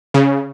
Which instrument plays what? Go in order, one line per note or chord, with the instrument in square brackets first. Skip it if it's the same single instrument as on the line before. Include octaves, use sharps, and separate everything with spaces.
[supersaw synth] C#3